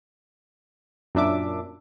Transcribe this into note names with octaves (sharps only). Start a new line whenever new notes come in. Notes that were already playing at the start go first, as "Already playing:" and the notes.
F#2 A#2 D4 E5 D6